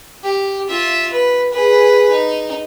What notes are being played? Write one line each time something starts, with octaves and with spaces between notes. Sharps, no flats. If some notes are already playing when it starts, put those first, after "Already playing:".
G4
F4 E5
B4
G#4 B4
D#4